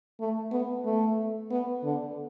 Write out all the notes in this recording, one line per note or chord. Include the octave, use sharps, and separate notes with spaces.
A3
B3
A3
B3
D3